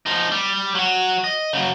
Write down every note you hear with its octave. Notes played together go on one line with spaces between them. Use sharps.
F3 D#4
G3
F#3 F#4
D#5
C#3 F#3